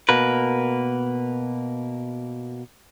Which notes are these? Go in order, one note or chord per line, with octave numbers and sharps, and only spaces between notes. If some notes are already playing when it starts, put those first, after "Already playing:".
B2 A#3 A#4 B4